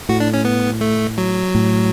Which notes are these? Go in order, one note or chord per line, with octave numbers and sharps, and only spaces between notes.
A2 F#4
D4
C#4
B3
A3
F#3
A2